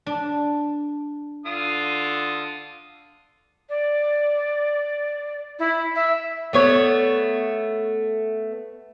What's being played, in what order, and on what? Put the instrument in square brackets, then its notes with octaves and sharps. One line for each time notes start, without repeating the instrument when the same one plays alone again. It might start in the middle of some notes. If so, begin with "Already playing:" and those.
[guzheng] D4
[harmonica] D3 F4 D#6
[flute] D5
E4
E5
[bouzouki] A3 B3 C#5